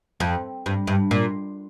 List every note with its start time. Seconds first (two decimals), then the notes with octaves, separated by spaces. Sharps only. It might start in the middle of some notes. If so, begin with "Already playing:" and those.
0.20 F2
0.66 G2
0.87 G2
1.11 A#2